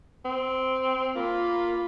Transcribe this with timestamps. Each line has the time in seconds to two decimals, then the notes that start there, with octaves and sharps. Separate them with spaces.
0.25 C4
1.16 A#3 F4 B5